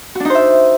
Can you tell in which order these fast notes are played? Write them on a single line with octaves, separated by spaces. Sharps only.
F#4 D4 D#4 C5 E5